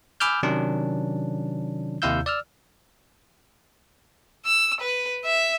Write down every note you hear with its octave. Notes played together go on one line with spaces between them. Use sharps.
G#5 B5 D6 E6 F6 G6
C3 D#3 F#3 C#4 D4
D#2 C3 E4 F5 E6 G6
D5 E6 F6
E6
B4
E5